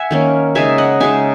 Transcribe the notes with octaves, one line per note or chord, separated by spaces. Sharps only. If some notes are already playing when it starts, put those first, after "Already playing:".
Already playing: E5 F#5 G#5
D#3 A#3 C#4
C#3 G#3 D#4 E5 G#5
D#5 F#5
C#3 G#3 D#4 E5 G#5